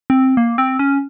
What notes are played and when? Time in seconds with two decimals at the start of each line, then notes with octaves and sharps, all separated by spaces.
0.10 C4
0.37 A#3
0.58 C4
0.79 C#4